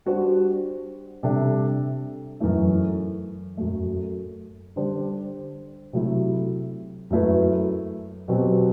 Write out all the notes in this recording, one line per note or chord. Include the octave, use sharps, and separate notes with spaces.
G3 D4 F#4 C5
C3 G3 D4 A4 E5
F#2 E3 A3
F#2 F#3 A3
D3 G3 D4 G4 C5
C3 F#3 A3 E4
F#2 F#3 A3 E4 B4
B2 F#3 C4 G4